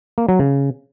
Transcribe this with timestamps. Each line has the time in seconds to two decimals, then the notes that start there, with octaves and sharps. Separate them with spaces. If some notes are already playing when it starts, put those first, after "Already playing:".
0.18 A#3
0.29 F#3
0.39 C#3